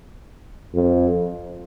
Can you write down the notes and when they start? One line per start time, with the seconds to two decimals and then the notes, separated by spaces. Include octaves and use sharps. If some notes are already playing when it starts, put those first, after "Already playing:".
0.74 F2